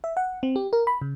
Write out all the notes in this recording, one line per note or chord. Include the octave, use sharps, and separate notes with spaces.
E5
F#5
C4
G4
A#4
B5
C#3